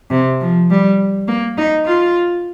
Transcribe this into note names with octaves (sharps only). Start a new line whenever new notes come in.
C3
F3
G3
A#3
D#4
F4